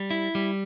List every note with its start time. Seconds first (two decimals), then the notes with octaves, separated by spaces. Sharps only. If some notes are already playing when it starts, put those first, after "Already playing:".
Already playing: G3
0.11 E4
0.35 G3